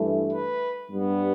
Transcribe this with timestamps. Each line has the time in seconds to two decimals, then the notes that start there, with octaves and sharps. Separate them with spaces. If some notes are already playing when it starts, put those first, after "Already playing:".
Already playing: G2 E3 A3
0.33 B4
0.89 G2 G3 B3